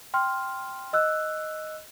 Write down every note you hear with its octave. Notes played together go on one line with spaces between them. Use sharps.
G5 C6 F6
D#5 E6 F#6